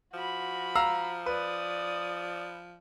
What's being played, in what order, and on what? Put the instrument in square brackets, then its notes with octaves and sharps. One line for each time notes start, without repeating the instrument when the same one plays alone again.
[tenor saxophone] F3 [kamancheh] F#4 B5
[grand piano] F5 A#5 E6
[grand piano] B4 [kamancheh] D5 D#6